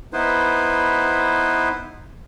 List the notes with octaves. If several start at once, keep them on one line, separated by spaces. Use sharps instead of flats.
B3 D#4 E4 B4 C5